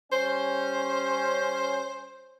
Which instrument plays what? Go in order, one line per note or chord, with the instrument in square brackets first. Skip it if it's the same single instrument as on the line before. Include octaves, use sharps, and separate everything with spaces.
[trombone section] G3 C#4 [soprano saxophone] C5